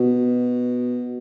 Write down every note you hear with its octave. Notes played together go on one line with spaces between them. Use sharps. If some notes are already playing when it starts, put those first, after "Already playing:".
Already playing: B2